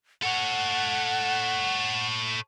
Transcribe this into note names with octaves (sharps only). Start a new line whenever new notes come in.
A4 C#5 F#5